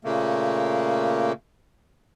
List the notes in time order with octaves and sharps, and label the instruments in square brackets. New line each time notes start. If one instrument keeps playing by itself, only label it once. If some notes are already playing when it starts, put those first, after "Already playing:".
[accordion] A#2 C#3 A3 A#3